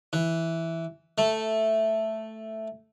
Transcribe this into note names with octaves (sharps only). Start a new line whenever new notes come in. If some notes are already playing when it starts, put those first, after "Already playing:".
E3
A3